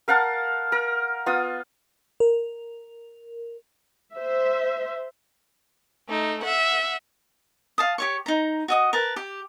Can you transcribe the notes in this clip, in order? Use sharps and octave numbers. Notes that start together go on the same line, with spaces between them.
A#4 F5 F#5 A5
A#4
B3 F4 D#6
A#4
C5 E5
A3 D#4
E5 F#5
F5 A5 D#6
G4 C#5 C#6
D#4 A#5
F#4 D#5 D#6
A#4 B4 A5
G4